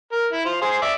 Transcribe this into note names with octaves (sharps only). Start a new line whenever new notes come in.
A#4
E4
F4 C5
G#4 C5
D5 E5